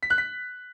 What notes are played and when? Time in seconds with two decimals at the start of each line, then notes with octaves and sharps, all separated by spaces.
0.03 B6
0.10 F#6
0.18 B6